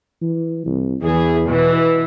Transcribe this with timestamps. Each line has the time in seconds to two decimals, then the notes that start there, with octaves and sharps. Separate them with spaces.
0.22 E3
0.66 C2
1.02 E2 E3 G#4
1.48 B2 E3